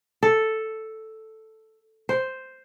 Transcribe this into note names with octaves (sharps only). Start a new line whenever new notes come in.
A4
C5